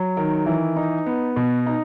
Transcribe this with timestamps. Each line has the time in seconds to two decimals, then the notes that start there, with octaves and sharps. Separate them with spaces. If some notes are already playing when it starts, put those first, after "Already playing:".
Already playing: F#3
0.17 D#3
0.46 E3
0.76 D#4
1.06 B3
1.36 B2
1.66 D#4